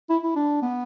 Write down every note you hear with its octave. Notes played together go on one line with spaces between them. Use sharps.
E4
E4
D4
B3